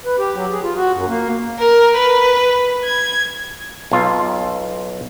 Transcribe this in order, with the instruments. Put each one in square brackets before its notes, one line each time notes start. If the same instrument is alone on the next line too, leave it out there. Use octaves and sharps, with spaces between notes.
[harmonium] B4
G4
F#3
G#4
F4
F#4
F#2
A#3
[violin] A#4
B4
G#6
[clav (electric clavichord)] B1 F4